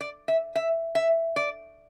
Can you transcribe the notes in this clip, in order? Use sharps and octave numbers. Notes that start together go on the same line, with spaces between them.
D5
E5
E5
E5
D5